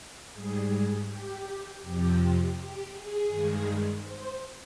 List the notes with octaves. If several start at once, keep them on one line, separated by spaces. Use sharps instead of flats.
G#2 G3 G#4
G4
F2 C3 F3 G4
G4
G#4
G2 D#3 G#3
C5